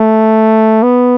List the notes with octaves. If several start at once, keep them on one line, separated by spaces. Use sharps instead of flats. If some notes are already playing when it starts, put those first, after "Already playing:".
Already playing: A3
B3